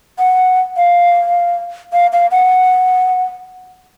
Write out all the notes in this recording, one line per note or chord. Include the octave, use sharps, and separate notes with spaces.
F#5
F5
F5
F5
F#5